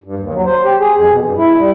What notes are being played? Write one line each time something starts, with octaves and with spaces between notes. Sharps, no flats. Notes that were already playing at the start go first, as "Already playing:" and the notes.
G2
D#2
F#3
C5
G4
G#4
F2
B2
G2
E4
G3